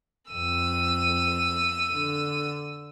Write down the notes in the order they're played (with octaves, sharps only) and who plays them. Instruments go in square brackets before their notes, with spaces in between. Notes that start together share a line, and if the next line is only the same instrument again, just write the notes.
[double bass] F2 [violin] E6 D#7
[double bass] D3